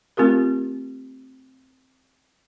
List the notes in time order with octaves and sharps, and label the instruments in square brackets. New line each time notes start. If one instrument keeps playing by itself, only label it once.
[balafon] A3 C4 F4 G4 A#4